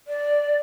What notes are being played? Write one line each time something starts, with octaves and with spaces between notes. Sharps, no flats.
D5